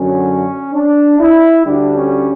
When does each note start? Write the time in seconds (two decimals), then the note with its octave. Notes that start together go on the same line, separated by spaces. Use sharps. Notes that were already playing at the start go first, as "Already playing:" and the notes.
Already playing: F#2 D3 F#3 C#4
0.73 D4
1.19 E4
1.65 D2 D3 G3 D4
1.95 C#4